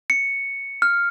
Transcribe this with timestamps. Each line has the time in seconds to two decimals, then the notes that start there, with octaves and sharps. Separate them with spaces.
0.10 C#7
0.82 F6